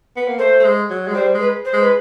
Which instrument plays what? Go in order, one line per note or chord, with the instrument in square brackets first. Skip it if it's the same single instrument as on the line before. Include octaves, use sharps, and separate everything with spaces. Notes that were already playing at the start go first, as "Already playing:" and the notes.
[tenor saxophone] B3
A#3
[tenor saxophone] A3 [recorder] C5
[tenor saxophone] A3
G#3
F#3
G#3
[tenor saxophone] G3 [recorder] C5
[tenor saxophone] G#3
[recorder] B4
C5
[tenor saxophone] G#3
[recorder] B4